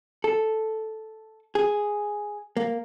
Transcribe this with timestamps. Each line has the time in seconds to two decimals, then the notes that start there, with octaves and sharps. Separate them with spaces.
0.24 A4
1.55 G#4
2.57 A#3